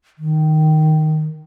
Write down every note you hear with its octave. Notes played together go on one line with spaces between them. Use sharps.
D#3